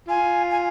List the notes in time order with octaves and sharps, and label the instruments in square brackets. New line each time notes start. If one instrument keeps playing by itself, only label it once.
[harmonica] F4 [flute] G#5
[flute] G#5